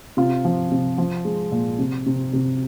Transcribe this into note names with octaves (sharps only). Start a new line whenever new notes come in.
C3 F4
F3
C3
F3
G#3
A#2
C3
C3
C3